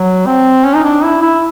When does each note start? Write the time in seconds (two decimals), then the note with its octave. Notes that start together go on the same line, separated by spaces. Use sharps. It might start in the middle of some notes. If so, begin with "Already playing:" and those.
Already playing: F#3
0.26 C4
0.64 C#4
0.75 D#4
0.83 D4
1.04 E4
1.22 E4